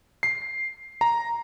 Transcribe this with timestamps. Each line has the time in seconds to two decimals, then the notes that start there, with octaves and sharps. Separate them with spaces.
0.23 C7
1.01 A#5